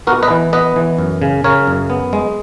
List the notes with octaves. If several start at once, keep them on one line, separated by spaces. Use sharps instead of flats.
B3 F#4 A#4
B4 D#5
E3
B3 B4 D#5
E3
F#2
C#3
C#3 A#4 C#5
F#2
B3
G#3